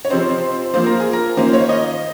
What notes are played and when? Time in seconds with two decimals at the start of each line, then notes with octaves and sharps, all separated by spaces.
0.05 C#5
0.10 C3 F3 C4 D#4 C5
0.74 F3 A#3 F4 C5
0.86 A#4
1.00 G#4
1.13 A#4
1.37 D#3 A#3 C#4 F4 C5
1.53 C#5
1.69 D#5